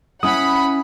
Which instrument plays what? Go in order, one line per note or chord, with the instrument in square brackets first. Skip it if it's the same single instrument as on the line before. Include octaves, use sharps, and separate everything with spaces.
[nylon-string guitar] C#4 E4 E5 [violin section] F#5 B5 [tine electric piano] D#6